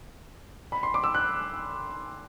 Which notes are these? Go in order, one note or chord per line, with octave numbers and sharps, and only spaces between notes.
B5
C6
D6
E6
F#6